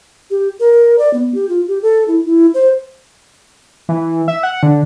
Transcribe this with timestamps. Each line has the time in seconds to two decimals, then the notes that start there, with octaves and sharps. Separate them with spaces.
0.31 G4
0.60 A#4
0.99 D5
1.14 B3
1.34 G4
1.49 F4
1.68 G4
1.82 A4
2.08 E4
2.26 E4
2.54 C5
3.89 E3
4.28 E5
4.43 F#5
4.63 D3